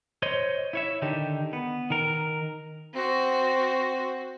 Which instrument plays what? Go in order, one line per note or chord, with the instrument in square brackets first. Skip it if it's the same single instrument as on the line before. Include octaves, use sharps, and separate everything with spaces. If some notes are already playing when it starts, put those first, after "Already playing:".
[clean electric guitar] C5 C#5 D#5 C6
E4 C#5 E5
D3 D#3 D#4 G4
B3
D#3 A#4
[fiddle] C4 F#4